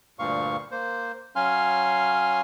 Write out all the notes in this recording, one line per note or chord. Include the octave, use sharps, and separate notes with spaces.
D2 G2 A#2 F5 C#6
A#3 C5
F#3 C#4 F5 G#5 C6 F6